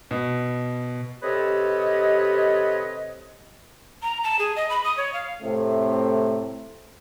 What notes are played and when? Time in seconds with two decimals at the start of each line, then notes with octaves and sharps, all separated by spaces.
0.11 B2
1.22 C3 G4 A4 B4 C#5 D#5
4.02 A#5
4.24 A5
4.39 G#4
4.56 D#5
4.70 B5
4.84 D#6
4.97 C#5
5.13 F5
5.42 A2 C3 A3 C4